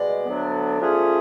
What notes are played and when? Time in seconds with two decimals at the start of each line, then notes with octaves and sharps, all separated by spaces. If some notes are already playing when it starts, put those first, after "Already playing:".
Already playing: B2 G#3 D5
0.25 D2 D3 F#3 B3 D4
0.80 F3 A3 C#4 F4 G#4